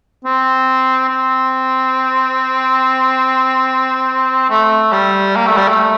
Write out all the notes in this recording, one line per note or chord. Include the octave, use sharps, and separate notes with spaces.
C4
C4
A3
G3
A#3
A3
G3
A3